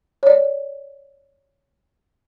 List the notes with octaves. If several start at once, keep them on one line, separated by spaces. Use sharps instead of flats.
C#5 D5